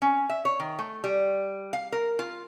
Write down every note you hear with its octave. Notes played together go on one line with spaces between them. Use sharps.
C#4
E5
C#5
D#3
A3
G3
F5
A#4
F4